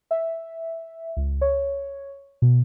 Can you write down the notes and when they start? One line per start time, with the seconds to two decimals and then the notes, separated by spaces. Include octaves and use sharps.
0.11 E5
1.17 C#2
1.41 C#5
2.42 B2